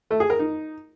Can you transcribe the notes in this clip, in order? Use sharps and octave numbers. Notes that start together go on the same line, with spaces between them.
A3
G#4
A#4
D#4